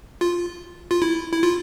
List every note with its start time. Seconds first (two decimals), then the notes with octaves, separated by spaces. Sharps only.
0.21 F4
0.91 F4
1.02 E4
1.32 E4
1.43 F4